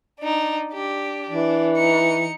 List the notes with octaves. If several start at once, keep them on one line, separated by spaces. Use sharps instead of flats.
D4 D#4
D4 G4
E3 D4
D#4 C#7